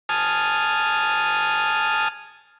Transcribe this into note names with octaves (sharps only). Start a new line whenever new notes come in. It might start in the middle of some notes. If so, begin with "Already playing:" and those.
G#5 A5 D#6 F6